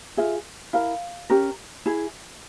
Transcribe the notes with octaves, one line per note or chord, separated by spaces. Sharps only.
F4 G#4 E5
E4 A#4 F5
C#4 G4 A#4
E4 G#4